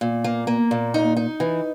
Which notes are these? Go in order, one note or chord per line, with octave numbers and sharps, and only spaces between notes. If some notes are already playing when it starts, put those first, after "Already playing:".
A#2
A#3
A#3
A#2
D#4
D#4
E3